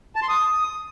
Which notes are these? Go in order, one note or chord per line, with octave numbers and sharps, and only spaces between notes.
A5
C6
D#6